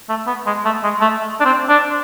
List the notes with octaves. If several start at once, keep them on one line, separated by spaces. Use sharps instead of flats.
A3
B3
G#3
A3
G#3
A3
D4
C4
D4